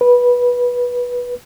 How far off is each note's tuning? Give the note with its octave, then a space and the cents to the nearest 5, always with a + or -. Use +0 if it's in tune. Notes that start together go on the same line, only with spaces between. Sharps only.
B4 -15